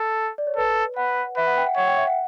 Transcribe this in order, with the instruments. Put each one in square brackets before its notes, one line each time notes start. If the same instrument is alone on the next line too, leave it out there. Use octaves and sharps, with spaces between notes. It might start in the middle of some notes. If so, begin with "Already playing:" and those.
Already playing: [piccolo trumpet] A4
[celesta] D5
C#5
[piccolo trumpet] A4 [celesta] B4
[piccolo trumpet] B4 [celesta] F#5
[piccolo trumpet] B4 [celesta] E5
[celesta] F#5
G5
F#5
[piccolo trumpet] C#5 [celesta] F#5
[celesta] G5
E5
F#5